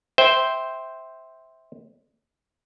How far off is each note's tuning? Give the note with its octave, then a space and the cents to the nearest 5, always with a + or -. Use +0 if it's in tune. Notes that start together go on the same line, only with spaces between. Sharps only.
C5 +0 E5 -15 G5 +0